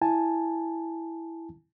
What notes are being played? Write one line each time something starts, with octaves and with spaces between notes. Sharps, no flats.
E4 G#5 A5